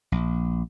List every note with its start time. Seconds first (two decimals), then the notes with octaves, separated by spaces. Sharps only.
0.12 A#1